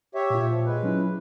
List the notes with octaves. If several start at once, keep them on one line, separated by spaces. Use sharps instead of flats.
G4 C#5 E5
A#2 F4
F3
G#3 B4
F#3 C#4 E4